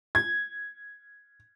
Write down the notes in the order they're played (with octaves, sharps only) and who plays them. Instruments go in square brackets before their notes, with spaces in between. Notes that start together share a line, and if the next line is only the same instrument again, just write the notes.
[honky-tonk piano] G#6